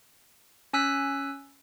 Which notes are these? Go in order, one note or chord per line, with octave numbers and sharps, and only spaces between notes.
C#4 G#5 E6 F#6 B6